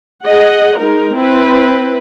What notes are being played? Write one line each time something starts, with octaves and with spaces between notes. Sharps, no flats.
G#4 D#5 F#5
G#3 D#4 A#4
C4 E4 B4